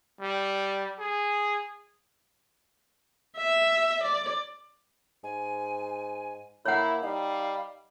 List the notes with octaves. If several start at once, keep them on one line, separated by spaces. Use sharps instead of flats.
G3
G#4
E5
D5
G#2 G#5
A#3 E4 C#5 F#5 A#5
G3 D#4 F5